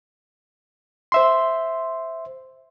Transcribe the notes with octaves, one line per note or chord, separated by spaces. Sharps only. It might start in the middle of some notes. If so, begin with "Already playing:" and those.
C5 E5 C6